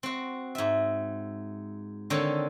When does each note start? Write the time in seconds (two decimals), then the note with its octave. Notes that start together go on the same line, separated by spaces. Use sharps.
0.03 C4 F#4
0.55 G#2 E5
2.10 D3 D#3 C4 A4 C#5